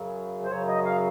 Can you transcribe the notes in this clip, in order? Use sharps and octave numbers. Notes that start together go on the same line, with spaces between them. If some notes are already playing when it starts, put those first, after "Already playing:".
Already playing: F#2 C#3 F#3
C5
F#2 C#3 F#3 C#5
D#5
F5